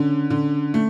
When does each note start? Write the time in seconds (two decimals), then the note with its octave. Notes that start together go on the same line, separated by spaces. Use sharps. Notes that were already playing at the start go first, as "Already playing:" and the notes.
Already playing: D3 C#4
0.30 D3
0.74 A3